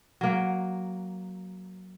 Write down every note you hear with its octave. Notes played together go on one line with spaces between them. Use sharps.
F#3 A#3